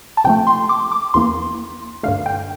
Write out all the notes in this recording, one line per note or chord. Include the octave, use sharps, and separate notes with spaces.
A5
C3 F3 A3 G5
C6
D6
D6
E2 E3 A#3 C6
G2 D3 A3 F5
G5